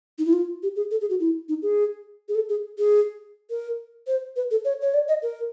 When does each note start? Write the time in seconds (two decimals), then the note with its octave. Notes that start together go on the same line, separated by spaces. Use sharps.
0.18 D#4
0.25 E4
0.33 F4
0.63 G4
0.76 G#4
0.91 A4
1.01 G#4
1.10 F#4
1.20 E4
1.49 D#4
1.62 G#4
2.29 G#4
2.35 A4
2.49 G#4
2.78 G#4
3.50 A#4
4.07 C5
4.36 B4
4.51 A4
4.65 C#5
4.81 C#5
4.94 D5
5.08 D#5
5.23 A#4